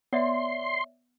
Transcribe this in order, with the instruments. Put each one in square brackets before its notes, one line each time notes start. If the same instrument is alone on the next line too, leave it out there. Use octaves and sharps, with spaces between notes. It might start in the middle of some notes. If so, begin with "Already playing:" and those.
[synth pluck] B3 [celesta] C#5 D5 E5 [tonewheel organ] C6